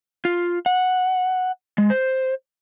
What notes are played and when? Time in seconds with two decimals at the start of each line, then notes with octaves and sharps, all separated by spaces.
0.25 F4
0.66 F#5
1.78 G#3
1.90 C5